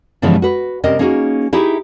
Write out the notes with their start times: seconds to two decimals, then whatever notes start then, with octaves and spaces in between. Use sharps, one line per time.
0.22 G2 C#3 E3 F3 G#3 B3
0.42 F#4 B4
0.84 C3 G3 C4 C#4 A#4 D#5
0.99 A#3 C#4 D#4 F#4 G#4
1.53 D#4 E4 G4 G#4 E5